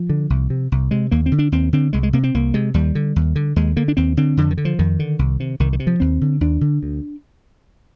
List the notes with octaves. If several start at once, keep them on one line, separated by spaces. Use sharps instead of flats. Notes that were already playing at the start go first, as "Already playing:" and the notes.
Already playing: F3
D3
C2
C3
C2
C3 G#3
D#2 A#3
C4
D3
D4
D#2 C4
D3 C4
C2 G#3
G#3
C3 A#3
C4
C2 A#3
C3 G#3
D#2 G3
D3
D#2
D3
D#2 G#3
D3 A#3
D4
D#2 C4
D3 C4
F2 D3
D#3
D3
F3
F2 D#3
D3
C2
C3
C2 D#3
D#3
C3
F3
D#2 C4
D3
D#2 D4
D3
D2